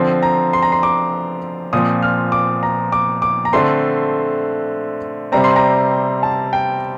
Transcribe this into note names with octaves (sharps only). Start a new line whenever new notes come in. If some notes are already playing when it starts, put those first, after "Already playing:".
Already playing: D3 F3 C4
A#5
C6
A#5
C6
D6
A#2 F3 C4 D#6
F6
D6
A#5
D6
D6
A#5
D3 A3 C4 C6
C3 G3 C4 A#5
C6
A#5
A5
G5